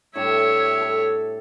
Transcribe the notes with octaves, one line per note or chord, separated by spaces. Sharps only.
A2 G3 D4 C#5 E5
A4